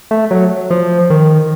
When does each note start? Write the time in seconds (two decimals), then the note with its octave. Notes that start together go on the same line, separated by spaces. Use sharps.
0.11 A3
0.31 F#3
0.71 F3
1.10 D#3